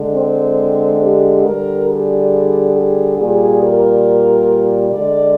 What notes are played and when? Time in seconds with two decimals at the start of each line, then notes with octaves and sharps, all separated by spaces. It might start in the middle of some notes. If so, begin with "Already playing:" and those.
Already playing: D3 G#3
0.15 C4
1.02 G4
1.45 D3 G3 A#4
1.88 G#4
2.75 G#4
3.19 A#2 G3 G#4
3.62 A#4
4.92 D3 G#3 D5